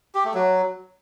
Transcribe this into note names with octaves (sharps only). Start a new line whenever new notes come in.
G4
A3
F#3